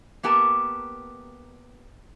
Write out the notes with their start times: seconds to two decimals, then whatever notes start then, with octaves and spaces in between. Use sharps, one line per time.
0.23 A#3 B3 G4 A#4 A5